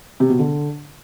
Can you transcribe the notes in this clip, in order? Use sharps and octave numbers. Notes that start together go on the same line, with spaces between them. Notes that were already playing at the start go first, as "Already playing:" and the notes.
C3
B2
D3